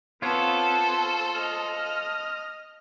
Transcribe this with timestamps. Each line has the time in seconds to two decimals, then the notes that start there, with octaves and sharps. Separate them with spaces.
0.22 B3 C4 F4 A4 C5 C#5
1.35 D#5 F6